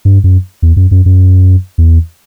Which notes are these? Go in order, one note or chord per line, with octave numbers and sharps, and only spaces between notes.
G2
F#2
E2
F#2
F#2
F#2
E2